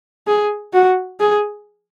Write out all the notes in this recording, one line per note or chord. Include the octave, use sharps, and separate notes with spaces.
G#4
F#4
G#4